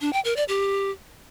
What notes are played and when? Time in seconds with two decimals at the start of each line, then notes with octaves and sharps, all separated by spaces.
0.01 D4
0.13 G5
0.25 A#4
0.36 D5
0.48 G4